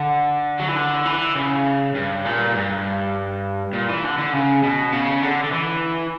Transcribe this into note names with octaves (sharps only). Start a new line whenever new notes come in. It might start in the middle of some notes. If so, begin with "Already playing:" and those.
Already playing: D3
F#3
E3
D3
E3
C#3
G2
A#2
G2
A#2
E3
D3
D3
C#3
B2
C#3
D3
D3
E3